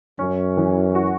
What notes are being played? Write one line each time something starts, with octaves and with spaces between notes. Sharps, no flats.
F#2 C#4
E3
F#4